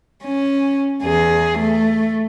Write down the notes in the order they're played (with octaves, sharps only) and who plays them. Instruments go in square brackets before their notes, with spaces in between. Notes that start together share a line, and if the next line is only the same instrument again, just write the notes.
[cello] C#4
E2 G#4
A3